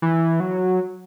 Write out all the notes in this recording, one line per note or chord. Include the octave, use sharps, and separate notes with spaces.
E3
F#3